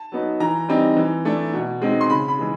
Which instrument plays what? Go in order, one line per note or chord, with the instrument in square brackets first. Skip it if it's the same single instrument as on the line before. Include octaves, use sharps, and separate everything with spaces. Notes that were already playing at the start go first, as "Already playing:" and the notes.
Already playing: [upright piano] A5
F#3 B3 D#4
E3 A#5
G3 C4 D#4
E3
A3 D4
B2
G#3 C4 D#4
C6
C#3 B5
B5
E3 G#3